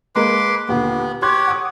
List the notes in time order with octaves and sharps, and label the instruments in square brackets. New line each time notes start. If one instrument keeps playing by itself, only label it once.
[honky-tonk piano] G#3 A#3 A#4 [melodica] B4 C6 D6
[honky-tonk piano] D#2 A#2 D3 [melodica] B3
[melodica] G4 C#5 [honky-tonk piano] C6 F#6 G#6
[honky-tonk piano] F#5 D6 D#6